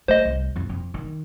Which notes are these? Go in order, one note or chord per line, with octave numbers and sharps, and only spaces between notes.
A3 C5 D#5
C2
F2 E4
F2
D#3